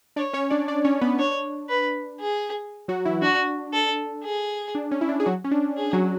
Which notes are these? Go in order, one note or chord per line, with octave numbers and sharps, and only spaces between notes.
D4 C#5 D5
C#4 C#5
D4 D5
D4 D5
C#4 C#5
B3 B4
D4 C#5
B4
G#4
F#3 F#4
E3 E4
D4 F#4
A4
G#4
D4
C#4
E4
D4
G#4
F#3 F#4
C#4
D4
G#4
F#3 F#4